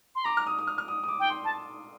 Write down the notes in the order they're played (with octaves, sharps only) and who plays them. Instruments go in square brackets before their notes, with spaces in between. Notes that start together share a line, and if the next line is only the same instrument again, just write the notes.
[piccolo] C6
[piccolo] A#5 [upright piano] D6
[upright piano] F6
D#6
D#6
F6
F6
D#6
D#6
D6
[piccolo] G5
[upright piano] C6
[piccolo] A5